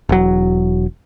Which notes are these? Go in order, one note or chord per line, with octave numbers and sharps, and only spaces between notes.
E1 F#3